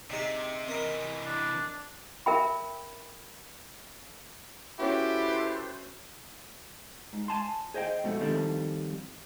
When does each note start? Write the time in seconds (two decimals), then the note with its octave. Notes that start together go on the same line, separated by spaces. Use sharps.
0.10 C3 D4 D#4 G#4
0.68 C3 E3 A#4 D#5
1.25 D4
2.26 A#4 E5 G5 B5
4.79 C#4 E4 F#4 G4 A4 B4 C5
7.13 G#2
7.28 G#5 A5 C6
7.74 G#4 C5 D#5 E5 G5
8.04 G#2 B2 F3 A3
8.21 D#3 F3 G3 C4 A4